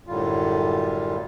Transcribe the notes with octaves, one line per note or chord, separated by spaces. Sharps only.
F#2 A2 D3 G3 F4